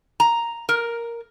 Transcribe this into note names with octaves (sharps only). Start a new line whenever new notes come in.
A#5
A#4